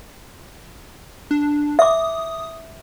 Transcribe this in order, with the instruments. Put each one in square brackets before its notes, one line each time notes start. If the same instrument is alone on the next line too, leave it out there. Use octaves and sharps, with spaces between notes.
[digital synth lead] D4
[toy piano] E5 D6 [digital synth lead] D#6